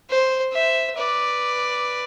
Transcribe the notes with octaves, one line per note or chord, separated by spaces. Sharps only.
C5
C5 E5
B4 D5